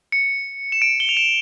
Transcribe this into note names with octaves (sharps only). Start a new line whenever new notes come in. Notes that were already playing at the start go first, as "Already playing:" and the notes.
C#7
E7
D7
G7
F7
E7